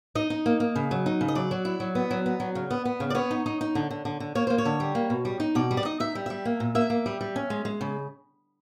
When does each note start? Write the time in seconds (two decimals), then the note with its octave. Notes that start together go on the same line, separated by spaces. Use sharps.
0.15 D#4 D#5
0.30 D#4
0.46 A#3
0.60 A#3
0.76 C#3
0.91 F#3
1.06 D#4
1.21 C#3
1.28 D#5
1.35 F#3 D5
1.51 F#3
1.65 E4
1.80 F#3
1.95 B3
2.11 F#3
2.26 B3
2.40 F#3
2.55 C#3
2.71 B3
2.85 B3
3.00 C#3
3.10 D5
3.15 B3 C#5
3.31 D#4
3.46 D#4
3.61 D#4
3.75 D3
3.91 D3
4.05 D3
4.20 D3
4.35 A#3 C#5
4.47 A#3 C5
4.58 C#5
4.65 D3
4.80 G3
4.95 A#3
5.10 B2
5.25 G3
5.40 D#4
5.55 B2 D5
5.71 G3
5.77 D5
5.85 D#4 D#5
6.00 D#4 E5
6.15 G3
6.26 G3 E5
6.45 A#3
6.60 A#2
6.75 A#3 E5
6.90 A#3
7.06 G3
7.21 G3
7.36 C#4
7.50 G#3
7.65 G#3
7.81 C#3